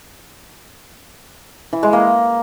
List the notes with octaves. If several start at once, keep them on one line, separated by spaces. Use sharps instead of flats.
E3
G#3
A#3